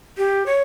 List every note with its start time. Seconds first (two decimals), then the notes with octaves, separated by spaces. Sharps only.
0.17 G4
0.46 C#5